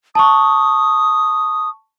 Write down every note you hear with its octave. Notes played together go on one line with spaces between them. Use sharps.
A5 C#6 D#6